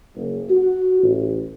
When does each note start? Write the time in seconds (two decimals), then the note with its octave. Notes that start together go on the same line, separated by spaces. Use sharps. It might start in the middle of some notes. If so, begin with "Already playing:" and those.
0.15 F#1
0.50 F#4
1.03 A1